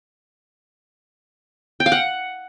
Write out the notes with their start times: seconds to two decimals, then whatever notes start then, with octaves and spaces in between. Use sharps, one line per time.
1.80 G5
1.86 F5
1.92 F#5